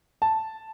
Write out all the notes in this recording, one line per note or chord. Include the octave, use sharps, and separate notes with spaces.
A5